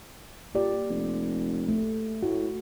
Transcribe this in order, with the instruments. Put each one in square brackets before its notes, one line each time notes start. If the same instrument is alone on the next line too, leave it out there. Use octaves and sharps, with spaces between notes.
[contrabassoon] A#2 [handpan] A#3 G4 D5
[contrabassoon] F1
[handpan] A3
[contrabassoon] A2 [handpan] F#4